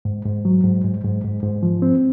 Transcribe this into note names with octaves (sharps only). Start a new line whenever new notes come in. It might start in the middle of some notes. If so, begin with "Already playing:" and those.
G#2
G#2
F#3
G#2
G#2
G#2
G#2
G#2
F3
C4